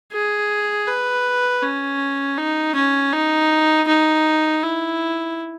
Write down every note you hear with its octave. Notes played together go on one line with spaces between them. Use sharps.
G#4
B4
C#4
D#4
C#4
D#4
D#4
E4